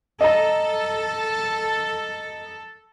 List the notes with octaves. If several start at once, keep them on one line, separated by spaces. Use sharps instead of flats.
A4 D#5 A#5